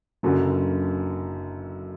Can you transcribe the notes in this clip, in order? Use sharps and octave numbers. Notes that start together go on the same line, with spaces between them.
F#1 F#2 D3